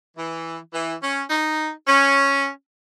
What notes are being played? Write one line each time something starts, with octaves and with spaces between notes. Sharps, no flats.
E3
E3
C#4
D#4
C#4